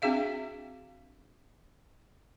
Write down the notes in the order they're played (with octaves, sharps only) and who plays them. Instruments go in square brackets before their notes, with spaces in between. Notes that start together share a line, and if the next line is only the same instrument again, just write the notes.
[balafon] C4 D4 F#4 G#4 E5 F5